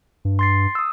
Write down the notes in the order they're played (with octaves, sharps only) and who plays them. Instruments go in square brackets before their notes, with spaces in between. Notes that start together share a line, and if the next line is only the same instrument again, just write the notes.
[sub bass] G2
[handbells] C6 A6 C7
D#6 E6